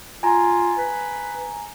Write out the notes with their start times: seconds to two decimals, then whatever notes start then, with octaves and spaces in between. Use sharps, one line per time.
0.23 F4 G#5 A#5
0.78 B4